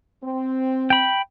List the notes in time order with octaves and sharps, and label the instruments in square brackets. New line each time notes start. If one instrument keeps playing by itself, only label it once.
[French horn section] C4
[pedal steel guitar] G5 B5